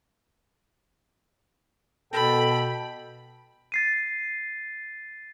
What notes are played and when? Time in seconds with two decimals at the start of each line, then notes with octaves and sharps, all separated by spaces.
2.13 B2 A4 G5 B5
3.72 A6 C7 D#7